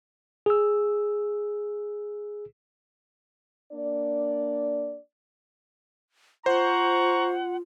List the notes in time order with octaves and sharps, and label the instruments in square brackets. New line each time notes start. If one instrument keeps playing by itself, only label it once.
[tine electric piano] G#4 E6
[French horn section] A#3 D4 D5
[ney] F4 [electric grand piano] C5 [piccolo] F#5 [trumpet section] A#5 C#6